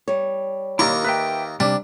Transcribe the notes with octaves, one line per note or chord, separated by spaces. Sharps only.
G3 C#5
D#2 A#3 E4 C#6
D#4 B4 E5 G5
C3 G3 D4